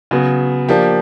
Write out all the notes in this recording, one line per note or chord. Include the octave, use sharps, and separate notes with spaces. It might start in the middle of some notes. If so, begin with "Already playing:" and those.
C#3 F#3 B3
F3 A#3 D4 G4